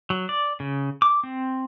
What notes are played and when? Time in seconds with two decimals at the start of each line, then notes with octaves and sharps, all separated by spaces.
0.10 F#3
0.29 D5
0.60 C#3
1.02 D6
1.23 C4